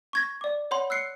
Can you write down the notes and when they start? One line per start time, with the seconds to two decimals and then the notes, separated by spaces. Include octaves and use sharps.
0.13 C#6 G#6 A#6
0.41 D5 D6
0.71 C#5 F#5 B5 C6
0.90 E6 F#6 C7 C#7